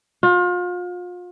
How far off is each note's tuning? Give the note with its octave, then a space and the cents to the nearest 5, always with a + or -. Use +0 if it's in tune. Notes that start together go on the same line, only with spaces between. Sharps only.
F4 +35